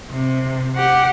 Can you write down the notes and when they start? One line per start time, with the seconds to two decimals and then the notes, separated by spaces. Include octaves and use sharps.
0.10 C3
0.76 G4 F#5